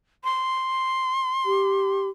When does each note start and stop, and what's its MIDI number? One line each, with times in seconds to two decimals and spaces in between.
0.24 2.05 84
1.46 2.09 67